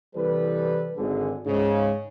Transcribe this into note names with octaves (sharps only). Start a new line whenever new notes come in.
C2 E3 G3 A4 B4
G#1 D3 G#4
G#2 C#3